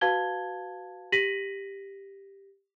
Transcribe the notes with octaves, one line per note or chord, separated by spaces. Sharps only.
F#4 B4 F5 A5 G#6 G7
G4 A#6 B6 D#7 F#7